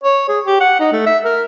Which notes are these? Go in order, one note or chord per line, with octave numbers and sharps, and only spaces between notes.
C#5
G#4
G4
F#5
D#4
A3
E5
A#4